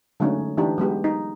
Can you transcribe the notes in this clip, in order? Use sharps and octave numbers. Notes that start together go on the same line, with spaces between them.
D3 F#3 G#3 A3 C#4 D#4
E3 A3 D4 D#4 G4
F#3 G#3 B3 G4
D#4